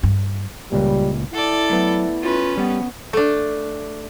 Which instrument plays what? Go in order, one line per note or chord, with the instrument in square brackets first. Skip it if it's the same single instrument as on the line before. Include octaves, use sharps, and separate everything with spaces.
[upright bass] G2
[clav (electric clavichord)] C#2 A#2 [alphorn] G3
[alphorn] E4 [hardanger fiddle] A4 D5 [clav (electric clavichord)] F#5
[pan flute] F#3 [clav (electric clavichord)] A3 B3
[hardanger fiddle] C#4 B4 [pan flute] F4
[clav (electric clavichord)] G3 [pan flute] B3
[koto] A3 D4